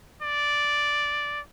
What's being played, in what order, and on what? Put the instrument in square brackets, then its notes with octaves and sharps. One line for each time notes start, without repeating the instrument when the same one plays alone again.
[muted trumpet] D5